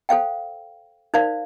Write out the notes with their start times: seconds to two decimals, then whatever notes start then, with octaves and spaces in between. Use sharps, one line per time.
0.09 A4 C5 F5 G5
1.14 D#4 A#4 C5 D5 F5